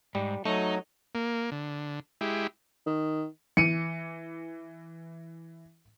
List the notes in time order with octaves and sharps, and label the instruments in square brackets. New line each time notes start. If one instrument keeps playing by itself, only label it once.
[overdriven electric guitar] G#2 [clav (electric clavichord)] G3
[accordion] F#3 [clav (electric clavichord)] A3 [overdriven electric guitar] D#4
[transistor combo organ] A#3
D3
G#3 E4 G4
[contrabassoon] D#3
[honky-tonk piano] E3 [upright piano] C#7 D#7